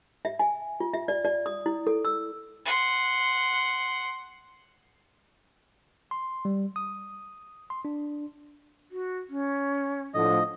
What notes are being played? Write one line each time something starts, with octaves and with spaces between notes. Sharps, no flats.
E5
G#5
F4
E5
D5
D5
D#6
E4
A4
E6
F#5 C6
C6
G3
D#6
C6
D4
F#4
C#4
A2 D3 F3 D#5